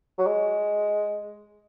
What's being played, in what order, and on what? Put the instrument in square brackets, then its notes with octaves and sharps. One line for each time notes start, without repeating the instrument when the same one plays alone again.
[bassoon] F#3
G#3